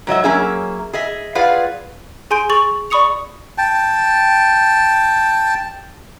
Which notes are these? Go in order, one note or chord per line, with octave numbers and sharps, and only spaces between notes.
G#2 F#3 D#5 E5
F#3 A#3 C#4 G#4 E5
G#4 D#5 E5
F4 G#4 B4 D5 F5 F#5
G#4 G#5 C6 G6 D7
G#4 C#6 A6 F7 F#7
D5 B5 C#6 D#6 C#7 F7
G5 A5